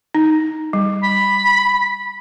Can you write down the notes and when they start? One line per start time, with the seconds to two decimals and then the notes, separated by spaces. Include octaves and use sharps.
0.15 D#4
0.73 G3
1.03 B5